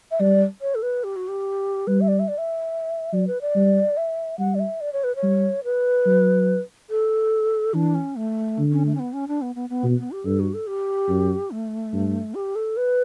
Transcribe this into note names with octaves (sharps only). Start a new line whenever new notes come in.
E5
G3 D5
C#5
A4
B4
G4
F#4
G4
G3 B4
E5
D5
E5
D5
E5
F#3 D5
B4
D5
G3
E5
G3 F#5
D5
E5
D5
C#5
B4
C#5
G3
B4
F#3
A4
E3 D4
C#4
A3
D3
C#4
A3
C#4
B3
C#4
D4
B3
B3
B3
B2
B3
G4
G2 A4
F#4
A4
G4
F#2
A3
G2
G4
A4
B4